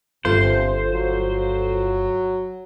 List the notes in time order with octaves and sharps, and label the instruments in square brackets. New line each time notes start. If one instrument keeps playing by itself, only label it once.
[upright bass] G1 [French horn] C3 [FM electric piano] F4 A4 F5 [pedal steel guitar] C5
[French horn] F#3